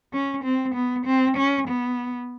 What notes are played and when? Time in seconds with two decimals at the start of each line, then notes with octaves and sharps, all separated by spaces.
0.13 C#4
0.44 C4
0.74 B3
1.06 C4
1.37 C#4
1.68 B3